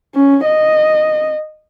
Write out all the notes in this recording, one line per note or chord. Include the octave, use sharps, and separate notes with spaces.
C#4
D#5